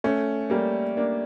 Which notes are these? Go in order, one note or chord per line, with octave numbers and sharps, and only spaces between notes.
A3 C#4
G3 A#3
A#3 D4